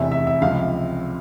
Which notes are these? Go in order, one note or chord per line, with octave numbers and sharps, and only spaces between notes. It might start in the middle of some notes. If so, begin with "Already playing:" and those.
Already playing: F1 E2 C3 E5
E5
E5
C#2 C3 F3 F5